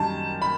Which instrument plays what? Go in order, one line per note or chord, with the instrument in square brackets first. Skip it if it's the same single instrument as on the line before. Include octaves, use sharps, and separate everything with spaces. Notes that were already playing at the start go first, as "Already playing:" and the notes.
Already playing: [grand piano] F#2 D#3 G3 D#4 A5
B5